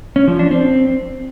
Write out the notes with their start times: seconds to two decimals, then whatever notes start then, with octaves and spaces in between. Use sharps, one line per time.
0.16 C#4
0.28 F3
0.39 D4
0.51 C4